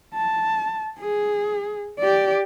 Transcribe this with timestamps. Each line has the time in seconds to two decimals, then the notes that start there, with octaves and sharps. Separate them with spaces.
0.15 A5
1.00 G#4
1.99 G4 D5